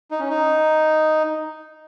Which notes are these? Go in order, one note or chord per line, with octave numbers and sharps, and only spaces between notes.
D#4
C#4
D#4